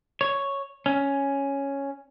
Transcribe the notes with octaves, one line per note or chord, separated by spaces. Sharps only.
C#5
C#4